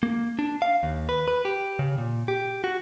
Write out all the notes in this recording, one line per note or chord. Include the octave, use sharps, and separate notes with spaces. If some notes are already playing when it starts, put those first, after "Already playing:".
A#3
D4
F5
D#2
B4
B4
G4
C#3
A#2
G4
F#4